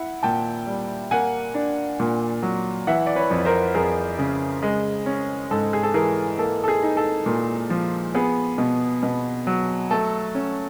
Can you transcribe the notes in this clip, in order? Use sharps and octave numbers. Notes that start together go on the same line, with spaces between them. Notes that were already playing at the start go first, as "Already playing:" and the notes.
Already playing: E4 F#5
A#2 G5 A5
G3
A#3 F#5 G#5
D4
A#2
F#3
E3 E5 F#5
D5
B4 C#5
F2
A#4 C5
F2 G#4 A#4
C#3
G#3
C#4
G#2 A4
G#4
A4
E3 G#4 A#4
A#3 A4
A4
G#4
D#4
A4
A#2
F3
B3 G#4
B2
B2
F#3
A3 A4
C#4